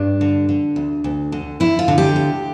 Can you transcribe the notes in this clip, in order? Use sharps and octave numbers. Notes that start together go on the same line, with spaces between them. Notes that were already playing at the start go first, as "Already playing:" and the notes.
Already playing: G2 D4
D3
D3
D2
D2
D3
D3 E4
F4
D3
G4
D2